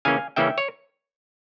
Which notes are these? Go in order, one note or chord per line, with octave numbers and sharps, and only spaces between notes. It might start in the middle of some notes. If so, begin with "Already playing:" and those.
C#3 E3 A#3 C#4 F5 G#5
C#3 E3 A#3 C#4 E5 G5
C#5